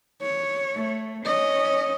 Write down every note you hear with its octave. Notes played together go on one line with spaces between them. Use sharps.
C#5
A3
C#4 D#5